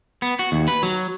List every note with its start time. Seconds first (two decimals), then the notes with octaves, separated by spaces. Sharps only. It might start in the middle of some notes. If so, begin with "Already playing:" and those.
0.22 B3
0.39 F#4
0.52 D#2
0.68 B4
0.83 F#3